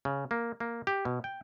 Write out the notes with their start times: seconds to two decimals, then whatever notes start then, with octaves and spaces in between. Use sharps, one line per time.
0.05 C#3
0.31 A#3
0.60 A#3
0.87 G4
1.05 B2
1.24 G5